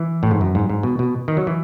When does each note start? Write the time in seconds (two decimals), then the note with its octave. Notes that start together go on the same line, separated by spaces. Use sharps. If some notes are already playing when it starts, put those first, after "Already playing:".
Already playing: E3
0.23 A2
0.31 G#2
0.41 F#2
0.55 G#2
0.69 G#2
0.83 B2
0.99 B2
1.28 D#3
1.37 F#3
1.47 E3